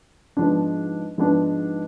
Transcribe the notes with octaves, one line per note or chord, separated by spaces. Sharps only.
G#2 F3 B3 D4
G#2 F3 B3 D4